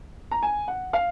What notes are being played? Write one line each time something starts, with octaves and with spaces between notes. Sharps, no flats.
A#5
G#5
F#5
F5